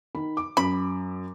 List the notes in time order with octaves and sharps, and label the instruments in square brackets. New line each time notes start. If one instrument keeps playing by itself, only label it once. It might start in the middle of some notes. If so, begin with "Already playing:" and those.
[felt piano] D#3 B5
D6
[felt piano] F#2 [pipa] B5